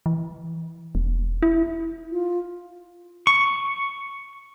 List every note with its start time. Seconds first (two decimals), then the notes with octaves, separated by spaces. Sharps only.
0.06 E3
0.95 E1
1.43 E4
2.12 F4
3.27 C#6